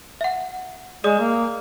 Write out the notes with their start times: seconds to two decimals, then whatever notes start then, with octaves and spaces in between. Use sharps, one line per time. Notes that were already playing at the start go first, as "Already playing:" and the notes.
0.21 E5 F#5
1.04 G#3 G#4 D5 D#6
1.19 A#3